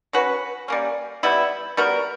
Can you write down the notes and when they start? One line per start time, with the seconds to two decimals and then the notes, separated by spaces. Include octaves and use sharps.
0.13 F#3 C#4 F#4 B4
0.68 G3 A#3 C#4
1.23 E3 G3 B3 E4
1.77 G3 B3 F#4 A#4